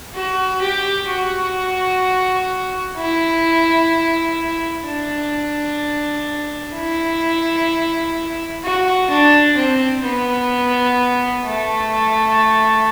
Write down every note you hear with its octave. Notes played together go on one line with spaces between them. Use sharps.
F#4
G4
F#4
E4
D4
E4
F#4
D4
C4
B3
A3